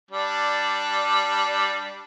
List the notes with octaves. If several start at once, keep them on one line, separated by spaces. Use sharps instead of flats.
G3 D4